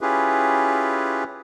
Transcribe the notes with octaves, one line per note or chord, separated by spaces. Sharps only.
C#4 E4 F4 G4 G#4 B4